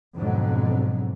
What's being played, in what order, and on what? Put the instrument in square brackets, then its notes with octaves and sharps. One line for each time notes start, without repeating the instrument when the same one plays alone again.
[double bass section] F2 G#2 B2 D3 F#3